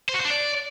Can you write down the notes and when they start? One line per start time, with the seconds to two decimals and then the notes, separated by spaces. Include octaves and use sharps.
0.09 C5
0.14 F#4
0.19 C5
0.25 D4
0.30 D5